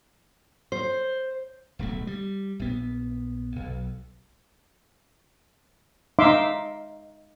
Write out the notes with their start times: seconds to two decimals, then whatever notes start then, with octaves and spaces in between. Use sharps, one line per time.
0.72 C5
1.79 D1 B1 A3
2.07 G3
2.59 A#1 B3
3.56 B1
6.19 D#4 E5 F5 C6 D6